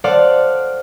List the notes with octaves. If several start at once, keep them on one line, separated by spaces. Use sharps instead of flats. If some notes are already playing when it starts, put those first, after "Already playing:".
A4 C5 D5 F5 F#5